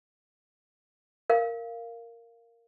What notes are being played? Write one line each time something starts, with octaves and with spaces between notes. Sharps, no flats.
A#4 F5